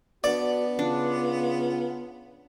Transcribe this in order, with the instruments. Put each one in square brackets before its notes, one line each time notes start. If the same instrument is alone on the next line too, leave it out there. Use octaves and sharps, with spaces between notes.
[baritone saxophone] B3 [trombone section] D4 F#4 [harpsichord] D5
[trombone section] C#3 F4 [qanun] D4